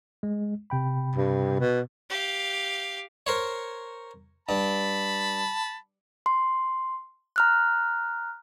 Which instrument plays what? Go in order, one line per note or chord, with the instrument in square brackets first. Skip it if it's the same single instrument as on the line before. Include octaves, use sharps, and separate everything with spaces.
[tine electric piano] G#3
C3 G5 B5
[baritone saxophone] G2
B2
[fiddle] G4 F5
[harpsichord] A#4 C5 C#5
[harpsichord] G2 [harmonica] A5 B5
[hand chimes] C6
A#5 F6 F#6